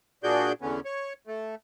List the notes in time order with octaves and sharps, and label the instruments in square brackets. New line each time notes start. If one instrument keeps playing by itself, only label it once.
[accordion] A#2 D4 F#4 G#4 D5 G6
E2 D3 B3 C#4
C#5
A3